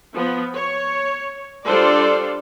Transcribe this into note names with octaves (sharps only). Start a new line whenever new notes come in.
F3 B3
C#5
G3 D4 F4 A4 C5 D5